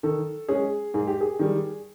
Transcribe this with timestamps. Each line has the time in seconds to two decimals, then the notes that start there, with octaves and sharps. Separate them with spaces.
0.03 D#3 A4
0.48 G#3 C#4 G#4
0.94 G#2 G#4
1.07 G4
1.21 G#4
1.39 D#3 G3